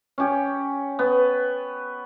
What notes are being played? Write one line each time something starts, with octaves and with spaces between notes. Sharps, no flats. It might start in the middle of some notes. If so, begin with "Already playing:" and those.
C#4 G4
B3